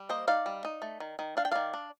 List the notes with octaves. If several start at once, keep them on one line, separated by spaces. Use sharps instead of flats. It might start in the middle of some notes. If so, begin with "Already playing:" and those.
Already playing: G3
A#3 C5 D#5
D#4 D5 F5
G3
D#4
A3
D#3
D#3
D4 F5
G5
D#3 D5 F5
D4